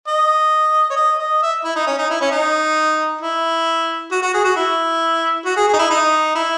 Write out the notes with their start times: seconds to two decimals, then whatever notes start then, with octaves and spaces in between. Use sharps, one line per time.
0.08 D#5
0.90 C#5
0.97 D#5
1.20 D#5
1.43 E5
1.65 E4
1.76 D#4
1.87 C#4
1.98 D#4
2.10 E4
2.21 C#4
2.31 D#4
3.21 E4
4.11 F#4
4.22 F#4
4.34 G#4
4.44 F#4
4.56 E4
5.45 F#4
5.57 G#4
5.68 G#4
5.73 D#4
5.79 E4
5.91 D#4
6.35 E4